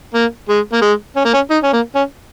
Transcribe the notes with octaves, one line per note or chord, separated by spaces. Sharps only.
A#3
G#3
A#3
G#3
C#4
A#3
C#4
D#4
C#4
A#3
C#4